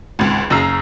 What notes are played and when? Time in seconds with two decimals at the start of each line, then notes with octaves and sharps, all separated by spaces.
0.19 G#1 C#2
0.50 F#1 C#3 A#5 E6 C7